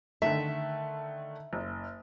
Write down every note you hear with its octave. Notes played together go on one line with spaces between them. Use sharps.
D3 D#3 A3 E5
F#1